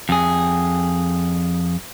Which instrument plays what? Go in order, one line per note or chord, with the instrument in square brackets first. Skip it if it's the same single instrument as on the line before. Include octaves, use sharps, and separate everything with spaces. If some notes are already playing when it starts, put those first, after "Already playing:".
[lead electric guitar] F2 G#4